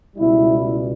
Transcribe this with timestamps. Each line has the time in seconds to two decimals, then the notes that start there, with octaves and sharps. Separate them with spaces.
0.16 C#2 B2 G3 E4